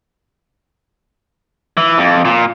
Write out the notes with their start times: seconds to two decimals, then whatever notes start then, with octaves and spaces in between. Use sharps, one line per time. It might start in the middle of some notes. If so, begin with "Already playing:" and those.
1.77 E3
1.98 F2
2.25 A#2